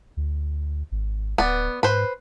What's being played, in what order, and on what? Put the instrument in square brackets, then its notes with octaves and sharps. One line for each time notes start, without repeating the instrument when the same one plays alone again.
[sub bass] D2
G#1
[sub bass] D1 [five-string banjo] B3 D5
[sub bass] G#2 [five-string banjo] B4 C5